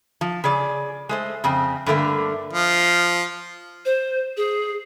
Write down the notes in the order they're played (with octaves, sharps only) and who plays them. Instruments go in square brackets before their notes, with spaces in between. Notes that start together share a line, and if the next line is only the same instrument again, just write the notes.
[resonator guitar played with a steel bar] F3
C#3 G#4 D5
G#3 A3 C5
F2 C#3 C4
G2 D3 A3 A#3
[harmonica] F3
[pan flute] C5
G#4